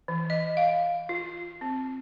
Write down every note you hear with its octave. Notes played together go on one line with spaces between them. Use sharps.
E3
D#5
F5
F4
C4